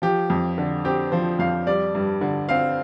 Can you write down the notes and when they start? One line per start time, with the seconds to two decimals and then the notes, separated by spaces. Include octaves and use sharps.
0.02 F3 G4
0.30 F2
0.58 D3
0.85 C4 G4
1.12 F3 C5
1.39 F2 F5
1.67 G3 D5
1.95 G2
2.21 D3
2.49 C4 F5